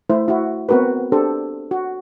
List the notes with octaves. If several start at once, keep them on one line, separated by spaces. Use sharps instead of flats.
A3 E4 C5
E4 F#4
B3 C4 F#4 A#4 B4
D4 G4 A4 C5
F#4